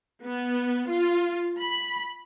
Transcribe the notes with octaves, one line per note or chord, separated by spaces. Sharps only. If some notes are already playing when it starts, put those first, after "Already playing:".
B3
F4
B5